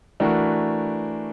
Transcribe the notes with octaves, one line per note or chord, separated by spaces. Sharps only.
E3 A3 D4 F#4 A#4